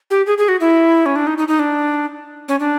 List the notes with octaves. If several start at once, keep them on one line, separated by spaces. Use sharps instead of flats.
G4
G#4
G#4
F#4
E4
C#4
D4
D#4
D#4
D#4
D4
C#4
D4